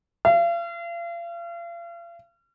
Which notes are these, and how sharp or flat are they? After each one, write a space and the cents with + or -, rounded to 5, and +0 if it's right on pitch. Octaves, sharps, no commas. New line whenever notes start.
F5 -40